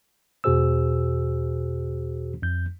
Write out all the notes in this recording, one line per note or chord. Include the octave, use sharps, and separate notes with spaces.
E2 B2 F#4 G#4 C5 E6
F2 G6